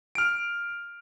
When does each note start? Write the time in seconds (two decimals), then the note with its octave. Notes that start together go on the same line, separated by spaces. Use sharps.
0.15 F6 D7